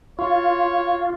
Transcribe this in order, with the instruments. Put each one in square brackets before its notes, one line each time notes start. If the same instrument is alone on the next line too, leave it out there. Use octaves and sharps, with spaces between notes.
[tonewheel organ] F4 [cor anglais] C#5